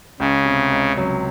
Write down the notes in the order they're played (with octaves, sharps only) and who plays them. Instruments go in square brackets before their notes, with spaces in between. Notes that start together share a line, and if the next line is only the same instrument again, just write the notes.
[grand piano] C#2 [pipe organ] C#3
[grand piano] C3
C#2
F#3